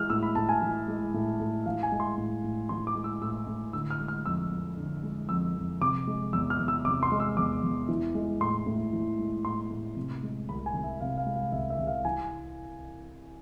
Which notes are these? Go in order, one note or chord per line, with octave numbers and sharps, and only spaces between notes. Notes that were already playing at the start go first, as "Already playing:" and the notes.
Already playing: E3 G#3 F6
A2 E6
B5
A2 A5
G#5
E3
G#3
A2
A2
E3 F5
G#5
G#3
C6
A2
A2
E3 C6
D6
G#3
E6
A2 E6
A2
D3 E6
F6
G#3
F6
F2 E6
F2
D3
G#3
F2 E6
F2
C3 D6
G#3
E2 E6
F6
E2
E6
C3 D6
C6
G#3
E6
E2 D6
E2
E3
G#3
A2 C6
A2
E3
G#3
A2 C6
A2
C3
G#3
C2 B5
G#5
C2
E5
C3 F5
F5
G#3
F5
C2 E5
E5
C2
F5
E3 G#5